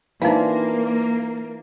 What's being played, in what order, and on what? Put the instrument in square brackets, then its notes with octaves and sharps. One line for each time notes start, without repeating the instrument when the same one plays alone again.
[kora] E3 [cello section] A#3 [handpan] C4 D4 F4 [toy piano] D#4 F5